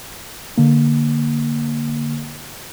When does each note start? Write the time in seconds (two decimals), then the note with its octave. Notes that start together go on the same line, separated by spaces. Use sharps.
0.57 D3 A#3